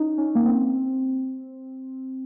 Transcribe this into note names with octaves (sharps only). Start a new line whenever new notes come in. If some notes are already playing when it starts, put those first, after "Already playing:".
Already playing: C#4 D#4
C#4
A#3
C4